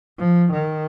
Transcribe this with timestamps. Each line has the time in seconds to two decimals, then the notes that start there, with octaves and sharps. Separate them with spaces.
0.18 F3
0.52 D#3